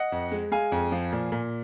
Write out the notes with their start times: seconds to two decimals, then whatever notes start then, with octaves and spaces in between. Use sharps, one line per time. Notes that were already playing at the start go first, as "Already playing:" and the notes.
Already playing: D#5 F#5
0.12 F2
0.32 G#3
0.52 G#3 F5 G#5
0.72 F2
0.92 F3
1.12 A#2
1.32 A#2